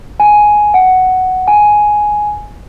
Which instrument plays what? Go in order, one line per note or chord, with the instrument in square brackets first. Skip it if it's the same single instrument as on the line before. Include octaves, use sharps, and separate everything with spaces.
[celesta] G#5
F#5
G#5